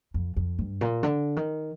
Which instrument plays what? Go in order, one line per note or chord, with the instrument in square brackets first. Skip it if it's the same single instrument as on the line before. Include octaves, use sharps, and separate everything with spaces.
[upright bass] F2
F2
G2
A#2
D3
D#3